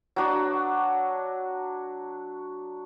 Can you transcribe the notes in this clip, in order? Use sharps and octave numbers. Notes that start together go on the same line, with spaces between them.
F#3 D4 F#4